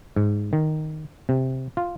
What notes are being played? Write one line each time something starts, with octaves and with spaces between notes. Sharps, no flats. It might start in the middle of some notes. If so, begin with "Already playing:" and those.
G#2
D#3
C3
F4